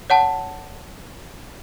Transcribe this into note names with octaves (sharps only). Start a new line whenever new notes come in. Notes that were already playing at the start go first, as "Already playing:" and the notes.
C#5 F#5 A5